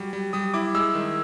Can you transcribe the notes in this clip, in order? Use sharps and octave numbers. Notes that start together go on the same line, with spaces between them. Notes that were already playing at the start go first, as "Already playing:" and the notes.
Already playing: F#3 G3
G3
G3 D#6
E4 D6
G#3 E6
D#3